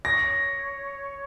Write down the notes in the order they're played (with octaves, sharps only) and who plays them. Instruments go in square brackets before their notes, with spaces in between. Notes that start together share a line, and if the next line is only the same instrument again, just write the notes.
[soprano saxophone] C#5 [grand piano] A#6